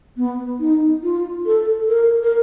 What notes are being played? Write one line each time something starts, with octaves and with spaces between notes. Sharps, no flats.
B3
D#4
F4
A4
A#4
A#4